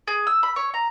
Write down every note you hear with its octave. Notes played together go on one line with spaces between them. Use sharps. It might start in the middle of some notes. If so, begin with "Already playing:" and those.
G#4
E6
B5
C#5
A#5